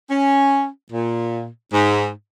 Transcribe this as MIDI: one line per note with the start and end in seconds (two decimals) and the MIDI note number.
0.10 0.67 61
0.92 1.47 46
1.73 2.09 44